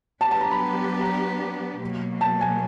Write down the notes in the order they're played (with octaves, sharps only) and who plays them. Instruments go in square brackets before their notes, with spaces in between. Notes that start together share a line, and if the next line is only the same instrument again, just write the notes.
[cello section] F#3 B3 D4 G4 B4 [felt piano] A5
[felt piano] A5
A#5
B5
A#5
[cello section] B2 F#3 A#3
[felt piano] A5
G#5